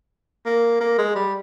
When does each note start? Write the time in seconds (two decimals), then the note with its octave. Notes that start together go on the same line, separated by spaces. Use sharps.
0.46 A#3
0.81 A#3
0.98 G#3
1.15 G3